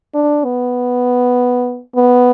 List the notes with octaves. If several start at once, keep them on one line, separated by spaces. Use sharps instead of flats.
D4
B3
B3